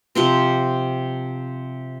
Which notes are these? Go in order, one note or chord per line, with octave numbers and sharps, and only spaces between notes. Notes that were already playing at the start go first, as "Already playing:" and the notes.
C3 F3 C4